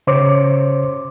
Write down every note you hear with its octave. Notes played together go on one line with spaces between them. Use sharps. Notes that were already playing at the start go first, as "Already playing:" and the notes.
C#3 C5 C#5 D6